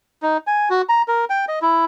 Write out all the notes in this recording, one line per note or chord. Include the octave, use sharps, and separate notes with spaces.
D#4
G#5
F#4
A#5
A#4
G5
D#5
E4